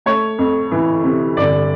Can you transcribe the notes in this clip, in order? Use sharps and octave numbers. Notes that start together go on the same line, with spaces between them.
A3 C#5
F2
E3
C3
G1 D5